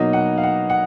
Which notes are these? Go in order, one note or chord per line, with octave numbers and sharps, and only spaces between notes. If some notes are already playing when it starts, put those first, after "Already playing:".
Already playing: B2 F#3 A#3 D#4 D#5
F#5
F5
F#5
F#5